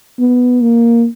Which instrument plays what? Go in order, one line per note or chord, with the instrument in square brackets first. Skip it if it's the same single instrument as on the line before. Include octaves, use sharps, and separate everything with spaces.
[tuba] B3
A#3